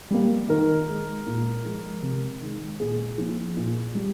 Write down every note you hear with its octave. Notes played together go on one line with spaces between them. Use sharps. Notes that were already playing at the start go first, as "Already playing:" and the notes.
G3 A#3
D#3 A#4
G#3
A#2
F3 G#3
C3
D#3 G#3
A#2 G#4
F3 A#3
A#2
G3